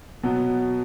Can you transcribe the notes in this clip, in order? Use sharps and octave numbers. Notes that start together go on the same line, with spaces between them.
B2 F#3 B3